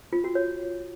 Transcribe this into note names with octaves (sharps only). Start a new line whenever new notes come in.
F4
F#4
C#5